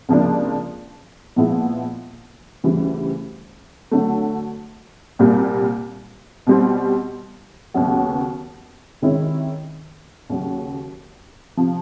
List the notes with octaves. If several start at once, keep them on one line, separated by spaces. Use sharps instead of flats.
C#2 C3 F3 A#3 D4
A#2 F3 G#3 B3 E4
D2 C#3 E3 G3
D3 F#3 A3
C2 A#2 G3 A#3
B2 G3 C4
D#2 C#3 F#3 B3
C3 D#3 G#3 C#4 E4
D#2 C#3 F#3
C3 F3